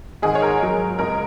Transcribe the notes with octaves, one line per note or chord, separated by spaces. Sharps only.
G#2 D#3 G#3 G#4
C#5
A#4
G#2 F#3
C#2 C#3 G#3 A#4